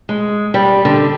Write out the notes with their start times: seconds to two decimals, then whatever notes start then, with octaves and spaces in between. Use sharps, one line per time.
0.09 G#3
0.54 G3
0.85 D3